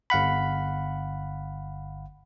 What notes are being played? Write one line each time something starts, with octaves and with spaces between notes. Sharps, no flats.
G1 F5 F#5 B5